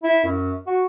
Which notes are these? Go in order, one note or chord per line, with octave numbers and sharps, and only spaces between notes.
E4
F#2
F#4